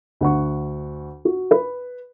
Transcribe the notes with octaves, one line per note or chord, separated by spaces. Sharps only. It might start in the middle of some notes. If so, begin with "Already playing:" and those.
D2 F#5 C#6
F#4
B4